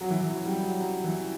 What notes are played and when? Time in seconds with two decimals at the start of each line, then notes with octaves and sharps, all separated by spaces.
0.01 F#3
0.10 E3
0.21 E3
0.28 F#3
0.46 G3
0.63 F#3
0.80 F#3
1.04 E3